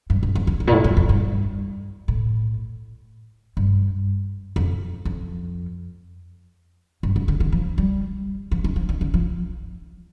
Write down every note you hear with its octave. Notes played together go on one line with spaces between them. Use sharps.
G2
G2
F2
F2
G2
A#2
A2
G2
F2
G2
A2
G2
F2
F2
G2
G2
D3
D#3
F3
G3
F3
D#3
F3
D#3
D3
F3